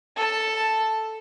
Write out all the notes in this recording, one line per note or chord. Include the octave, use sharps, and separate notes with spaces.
A4 A5